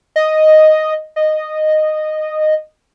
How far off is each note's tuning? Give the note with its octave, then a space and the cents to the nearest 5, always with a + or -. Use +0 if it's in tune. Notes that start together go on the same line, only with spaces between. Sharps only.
D#5 +0
D#5 -10